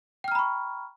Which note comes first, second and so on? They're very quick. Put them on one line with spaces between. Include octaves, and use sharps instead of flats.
G5 F6 A#5 B5 C#6